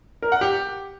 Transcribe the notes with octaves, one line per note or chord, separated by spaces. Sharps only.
A#4
F#5
G4